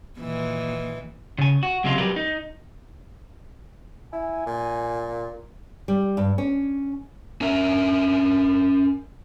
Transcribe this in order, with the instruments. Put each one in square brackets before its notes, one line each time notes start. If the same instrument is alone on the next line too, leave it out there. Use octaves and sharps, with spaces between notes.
[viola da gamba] A#2 D#3 E3
[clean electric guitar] C#3 G#5
F#4
C#2 C3 F#3 G#3 F4
F#3 G3 G4 A#4 B4
D#4
[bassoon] E4 [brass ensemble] G#5
[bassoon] A#2
[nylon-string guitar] G3
G2
C#4
[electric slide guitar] C#4 A#4 E5